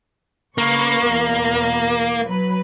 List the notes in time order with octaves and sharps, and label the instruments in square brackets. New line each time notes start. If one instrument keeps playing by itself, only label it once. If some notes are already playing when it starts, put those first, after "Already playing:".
[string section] C#3 B4 C#6 [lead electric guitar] A#3
[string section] E2 B2
F#3 B4